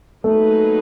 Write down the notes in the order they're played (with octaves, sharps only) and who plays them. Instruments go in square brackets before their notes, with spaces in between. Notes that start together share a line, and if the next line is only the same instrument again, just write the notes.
[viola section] F#3 A#3 D#4 G#4 B4 [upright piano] A3